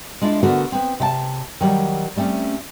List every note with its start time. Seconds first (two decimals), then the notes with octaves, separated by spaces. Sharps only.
0.22 G#3 D4 E4 F4
0.43 D3 A3 B3 F#4 A4 A#4
0.72 B3 C4
1.00 C3 E5 A5
1.61 D#3 F#3 G3
2.16 G3 A3 C4 C#4